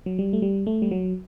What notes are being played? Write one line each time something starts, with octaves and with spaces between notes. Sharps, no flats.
F#3
G3
A3
G3
A3
G3
F#3